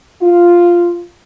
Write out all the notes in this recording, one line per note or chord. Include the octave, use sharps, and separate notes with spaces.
F4